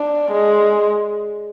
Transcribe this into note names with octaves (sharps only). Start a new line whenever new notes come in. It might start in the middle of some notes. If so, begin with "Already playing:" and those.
Already playing: D4
G#3